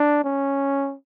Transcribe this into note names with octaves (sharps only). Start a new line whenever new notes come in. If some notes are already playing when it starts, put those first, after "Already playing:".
Already playing: D4
C#4